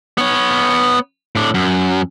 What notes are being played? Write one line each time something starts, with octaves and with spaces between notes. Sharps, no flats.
B3 C#5
A2 D4
F#2